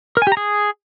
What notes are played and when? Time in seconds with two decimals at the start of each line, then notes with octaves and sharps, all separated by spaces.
0.17 A#4
0.22 G#5
0.27 G4
0.32 A#5
0.37 G#4